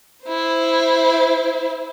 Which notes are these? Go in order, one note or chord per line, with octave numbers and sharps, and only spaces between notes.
E4 C5